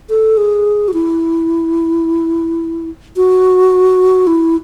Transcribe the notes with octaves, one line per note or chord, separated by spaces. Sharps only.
A4
G#4
F#4
E4
F#4
E4